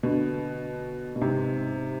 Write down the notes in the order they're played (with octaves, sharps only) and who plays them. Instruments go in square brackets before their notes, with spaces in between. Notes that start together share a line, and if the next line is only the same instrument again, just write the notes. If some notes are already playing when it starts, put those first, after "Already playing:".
[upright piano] B2 D3
B2
G#2 C3